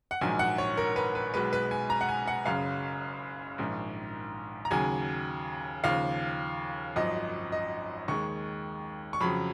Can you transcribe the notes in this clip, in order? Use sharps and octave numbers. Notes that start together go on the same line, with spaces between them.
F#5
A#1 G#2 D#3 F#3 G#5
F#5
C#5
A#4
B4
B4
B1 B2 G#3 B4
B4
G#5
A#5
F#5
G#5
F#5
F#1 F#2 C#3 F5
A#1 G#2 D#3
A#5
D#2 C#3 F#3 G#5
D#2 C#3 F3 F5
G#1 F#2 F3 D#5
D#5
D#2 D#3 G#3 C#6
C#6
F2 C#3 F#3 B5